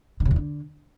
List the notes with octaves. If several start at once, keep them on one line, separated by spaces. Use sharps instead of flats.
D3
C#3
E2
D3